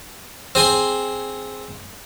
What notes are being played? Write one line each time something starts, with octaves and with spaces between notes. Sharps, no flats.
C4 G#4 G#5 C6